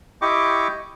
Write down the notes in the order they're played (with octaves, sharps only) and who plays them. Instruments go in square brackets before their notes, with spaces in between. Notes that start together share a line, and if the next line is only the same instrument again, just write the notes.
[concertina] E4 G4 D#5 G5 C#6 D6